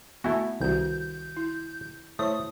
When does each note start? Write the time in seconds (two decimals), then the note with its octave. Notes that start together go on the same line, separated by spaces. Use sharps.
0.24 A3 B3 E4 F#4 G#5 B5
0.61 C2 D#3 F#4 G6
1.37 E4
2.19 A3 E4 C5 C#5 D#6